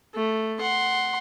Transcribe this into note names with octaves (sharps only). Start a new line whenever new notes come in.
A3
F#5 C6